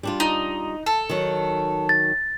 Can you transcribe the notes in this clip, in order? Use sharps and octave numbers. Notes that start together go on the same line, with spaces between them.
G3 D4 F4
D#4
A4
D#3 F#3
A6